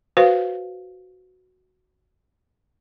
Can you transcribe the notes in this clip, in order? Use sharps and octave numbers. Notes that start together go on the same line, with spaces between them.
F#4 B4 C5 F5